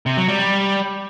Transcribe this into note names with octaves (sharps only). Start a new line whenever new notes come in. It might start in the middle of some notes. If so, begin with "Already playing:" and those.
C3
F#3
G3
G3